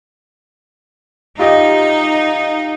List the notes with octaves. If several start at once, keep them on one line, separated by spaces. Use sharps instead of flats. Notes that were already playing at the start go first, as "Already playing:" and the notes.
D#4 F4 G4 D#5